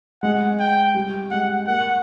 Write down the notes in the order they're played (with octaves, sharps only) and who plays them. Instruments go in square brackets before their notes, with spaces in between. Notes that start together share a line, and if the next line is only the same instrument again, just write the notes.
[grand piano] G#3 [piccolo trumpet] F#5
[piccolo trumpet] G5
[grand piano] G3
[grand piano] G#3 [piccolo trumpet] F#5
[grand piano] A#3 [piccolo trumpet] F#5